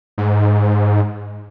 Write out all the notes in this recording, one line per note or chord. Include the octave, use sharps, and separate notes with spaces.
G#2